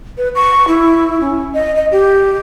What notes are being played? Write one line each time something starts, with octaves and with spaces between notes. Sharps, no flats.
B4
C#6
E4
C#4
D#5
D#5
G4